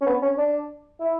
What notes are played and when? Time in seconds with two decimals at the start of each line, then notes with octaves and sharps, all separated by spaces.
0.01 C#4
0.06 B3
0.22 C#4
0.38 D4
1.00 E4